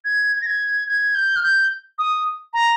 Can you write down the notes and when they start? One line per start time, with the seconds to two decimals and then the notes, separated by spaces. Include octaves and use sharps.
0.05 G#6
0.42 A#6
0.46 G#6
0.88 G#6
1.15 G6
1.36 F6
1.43 G6
1.99 D#6
2.53 A#5